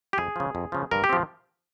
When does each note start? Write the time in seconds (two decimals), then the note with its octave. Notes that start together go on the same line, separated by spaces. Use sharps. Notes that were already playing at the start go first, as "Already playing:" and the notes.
0.13 G4
0.18 F2 G#4
0.36 C#3 F3
0.55 F2
0.72 C#3 F3
0.91 G2 A#4
1.04 G4
1.09 F3 C4